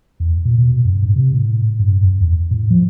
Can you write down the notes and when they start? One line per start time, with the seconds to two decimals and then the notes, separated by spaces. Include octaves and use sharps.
0.20 E2
0.45 A#2
0.58 B2
0.85 F#2
1.03 G#2
1.16 C3
1.34 A2
1.79 G2
2.03 F#2
2.20 E2
2.51 A2
2.70 F3